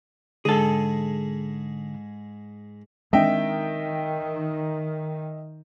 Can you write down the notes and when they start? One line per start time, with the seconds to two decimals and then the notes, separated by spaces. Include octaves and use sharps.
0.45 G#2 D3 G#3 G#4 A4
3.13 D#3 G#3 C4 D4 D#5 E5 G5